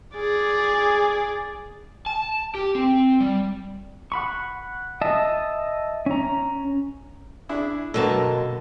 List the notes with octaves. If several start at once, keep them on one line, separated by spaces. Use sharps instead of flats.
G#4 D5
A5
G4
C4
G3
F#5 B5 C#6
D#5 E5 A5
C#4 A#5
D4 E4 G#4
F#2 B2 D3 A#3 A5 E6